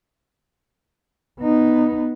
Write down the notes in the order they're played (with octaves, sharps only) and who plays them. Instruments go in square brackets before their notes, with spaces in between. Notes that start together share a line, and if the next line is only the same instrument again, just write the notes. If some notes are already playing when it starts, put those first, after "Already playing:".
[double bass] B3 D#4